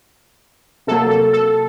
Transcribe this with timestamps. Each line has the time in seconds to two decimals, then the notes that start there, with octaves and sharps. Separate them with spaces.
0.87 C3 F#3 A#3 A4
1.10 A4
1.33 A4